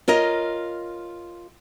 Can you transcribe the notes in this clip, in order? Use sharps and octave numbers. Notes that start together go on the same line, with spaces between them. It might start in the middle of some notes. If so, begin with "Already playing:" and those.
F4 A#4 C#5 D#5